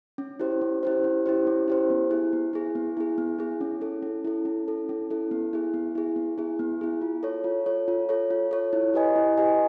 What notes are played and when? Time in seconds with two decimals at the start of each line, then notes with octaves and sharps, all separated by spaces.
0.18 C#4
0.40 E4 G4 C5
0.61 C#4
0.83 E4 G4 C5
1.04 C#4
1.26 E4 G4 C5
1.47 C#4
1.68 E4 G4 C5
1.90 B3
2.10 E4 G#4
2.33 B3
2.53 E4 G#4
2.75 B3
2.97 E4 G#4
3.18 B3
3.39 E4 G#4
3.61 C#4
3.81 E4 A4
4.03 C#4
4.25 E4 A4
4.45 C#4
4.68 E4 A4
4.89 C#4
5.10 E4 A4
5.31 B3
5.53 E4 G#4
5.74 B3
5.95 E4 G#4
6.16 B3
6.38 E4 G#4
6.59 B3
6.81 E4 G#4
7.02 F4
7.23 A4 C#5
7.44 F4
7.66 A4 C#5
7.88 F4
8.09 A4 C#5
8.30 F4
8.51 A4 C#5
8.73 E4
8.94 G4 B4 D#5 G#5
9.16 E4
9.37 G4 B4 D#5 G#5